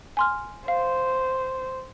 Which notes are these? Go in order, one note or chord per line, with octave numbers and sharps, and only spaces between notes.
G#5 C6 F6
C5 F5